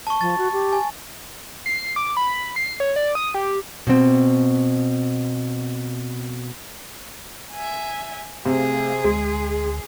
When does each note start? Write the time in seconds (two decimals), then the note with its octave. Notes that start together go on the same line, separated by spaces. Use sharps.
0.07 A5 C#6
0.21 F3 A6
0.38 F#4
0.53 G4
0.73 G#5
1.66 C7
1.96 D6
2.17 B5
2.56 C7
2.80 C#5
2.96 D5
3.15 D#6
3.35 G4
3.87 B2 C4
7.52 E5 G#5
8.45 C3 A3 G#4 F5
9.04 D2 G#3